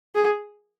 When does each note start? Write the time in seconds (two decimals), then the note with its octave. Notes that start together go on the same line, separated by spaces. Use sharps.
0.15 G#4